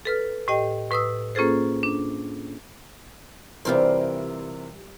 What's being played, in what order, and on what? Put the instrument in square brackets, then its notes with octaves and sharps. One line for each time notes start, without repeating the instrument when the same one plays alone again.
[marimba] A4 B4 F6
A2 G4 D#5 G5
A2 B4 D#6 E6
A#3 C#4 F4 G#4 A4 C5
D4
[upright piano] C3 E3 A#4 [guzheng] G3 F4 C5